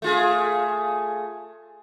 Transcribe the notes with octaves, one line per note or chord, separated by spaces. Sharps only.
A3 F4 G#4